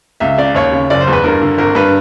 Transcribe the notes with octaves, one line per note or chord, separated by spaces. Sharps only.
C#2 E5
C#3 D5
D#2 C#5
C#3
F#1 D5
C5
E2
B4
G2 A#4
D3
G#1 A#4
G2 B4